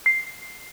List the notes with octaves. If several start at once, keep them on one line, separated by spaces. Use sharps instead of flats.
C7